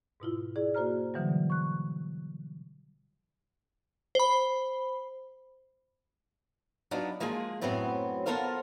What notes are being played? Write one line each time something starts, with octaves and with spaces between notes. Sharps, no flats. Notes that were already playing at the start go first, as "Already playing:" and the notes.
G#2 B2 E4 F4
E4 G#4 D5
A#3 F#4 C5 A#5 F6
B2 D3 E3 F#3 G3
C#6 F#6
C5 B5
F#3 B3 D4 D#4 F4
F3 G#3 A#3 F4 G#4
F#2 A2 F#3 B3 C4
B3 F4 A4 A#4 C5 F5